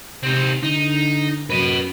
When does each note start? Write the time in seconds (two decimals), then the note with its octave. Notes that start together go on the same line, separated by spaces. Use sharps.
0.23 C3 C4 D#4
0.63 D3 D#4
1.50 F#2 B4 D#5